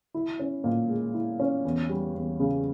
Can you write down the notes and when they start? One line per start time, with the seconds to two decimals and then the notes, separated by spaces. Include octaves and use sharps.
0.14 E4
0.39 C#4
0.64 A#2
0.89 G#3
1.14 E4
1.39 C#4
1.65 E2
1.89 G3
2.15 E2
2.40 C#3